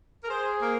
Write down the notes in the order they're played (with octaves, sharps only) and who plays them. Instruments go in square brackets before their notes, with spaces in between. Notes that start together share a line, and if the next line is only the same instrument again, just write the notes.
[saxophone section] A#4
[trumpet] G#4 [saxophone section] C5
[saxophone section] A#3